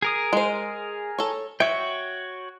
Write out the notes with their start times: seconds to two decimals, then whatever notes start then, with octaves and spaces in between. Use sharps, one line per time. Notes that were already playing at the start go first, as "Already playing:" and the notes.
0.02 G#4 A#4 D#6
0.33 G#3 C5
1.19 A4 C#5
1.60 F#4 C#5 E5 G5